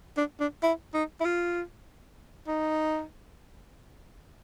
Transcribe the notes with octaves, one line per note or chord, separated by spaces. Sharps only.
D4
D4
E4
D#4
E4
F4
D#4